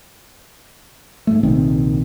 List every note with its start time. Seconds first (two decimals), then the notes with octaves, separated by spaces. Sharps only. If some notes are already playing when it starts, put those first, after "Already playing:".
1.27 G#2 A3
1.43 A#1 C3 D#3 C4